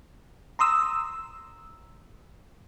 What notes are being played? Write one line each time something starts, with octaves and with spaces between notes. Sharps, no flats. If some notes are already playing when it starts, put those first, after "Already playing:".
A#5 C6 D#6 E6